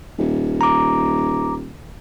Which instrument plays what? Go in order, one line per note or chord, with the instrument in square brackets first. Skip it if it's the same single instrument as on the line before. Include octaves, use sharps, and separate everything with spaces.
[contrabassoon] D#1
[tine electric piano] A#5 D6